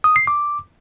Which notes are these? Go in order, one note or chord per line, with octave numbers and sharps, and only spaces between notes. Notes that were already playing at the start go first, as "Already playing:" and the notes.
D#6
C7
D6